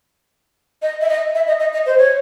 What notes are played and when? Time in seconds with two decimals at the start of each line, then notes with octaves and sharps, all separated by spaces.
0.82 D#5
1.01 E5
1.09 D#5
1.35 E5
1.47 D#5
1.60 D#5
1.73 D#5
1.86 C5
1.97 C#5